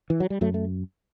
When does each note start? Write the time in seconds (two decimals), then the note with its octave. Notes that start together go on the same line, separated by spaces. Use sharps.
0.10 E3
0.20 F#3
0.30 G3
0.41 F#2 F#3 A3
0.54 A3